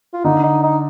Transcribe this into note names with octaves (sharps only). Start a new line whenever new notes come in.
F4
D3 D#4
D#4
D#4